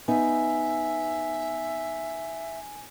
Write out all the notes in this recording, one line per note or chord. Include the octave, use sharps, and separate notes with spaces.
B3 D#4 E5 G#5